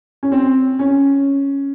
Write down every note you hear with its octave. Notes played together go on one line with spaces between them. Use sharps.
C#4
C4
C#4